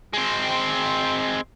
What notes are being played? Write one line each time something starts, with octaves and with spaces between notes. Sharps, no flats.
G#3 C4